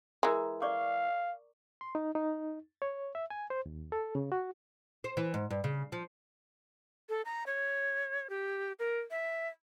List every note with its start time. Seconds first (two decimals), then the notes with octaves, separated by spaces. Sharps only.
0.23 E3 G#3 A#4 A#5
0.62 D5 F5 C#6 D6
1.81 C6
1.95 D#4
2.15 D#4
2.82 C#5
3.15 E5
3.30 G#5
3.50 C5
3.66 D#2
3.92 A4
4.15 C#3
4.32 F#4
5.04 C5
5.17 E3
5.34 G#2
5.50 G2
5.64 C#3
5.92 F3
7.09 A4
7.25 A#5
7.46 C#5
8.30 G4
8.79 A#4
9.11 E5